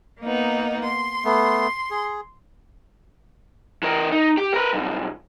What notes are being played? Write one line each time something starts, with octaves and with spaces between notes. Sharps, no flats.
A#3 B3 D#4
C6
A3 B3
G#4
E3 A#4
D#4
G4
A#4 B4
B1 G2